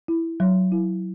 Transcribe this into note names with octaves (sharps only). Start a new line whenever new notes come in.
E4
F#3
E4